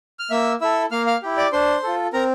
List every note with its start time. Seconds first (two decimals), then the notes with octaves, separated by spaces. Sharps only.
0.19 F6
0.31 A#3 E5 E6
0.61 E4 A4 E5 E6
0.91 A#3 F5 F6
1.07 F5 F6
1.22 E4 G4
1.37 D5 D6
1.53 D4 C5 C6
1.83 F4 A4
2.13 C4 A#4 A#5